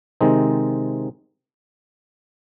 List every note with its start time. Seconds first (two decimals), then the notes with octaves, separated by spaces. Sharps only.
0.21 C3 D#3 G#3 C4 D#4